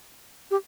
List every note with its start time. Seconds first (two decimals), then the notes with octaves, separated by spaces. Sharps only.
0.51 G4